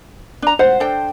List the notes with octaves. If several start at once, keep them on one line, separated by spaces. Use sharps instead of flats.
D4 A#5
C5 F#5
D4 A4 G5